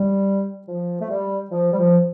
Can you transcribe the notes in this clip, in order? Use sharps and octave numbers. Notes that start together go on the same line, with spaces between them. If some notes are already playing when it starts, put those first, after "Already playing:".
Already playing: G3
F3
A3
G3
F3
G3
F3